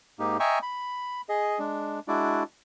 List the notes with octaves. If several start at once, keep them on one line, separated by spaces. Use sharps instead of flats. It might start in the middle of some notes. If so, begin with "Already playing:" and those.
G#2 A#3 D#4 G4
D#5 E5 G5 G#5 A#5 C#6
B5
G#4 D#5
G#3 D4
G#3 D4 E4 F#4 D5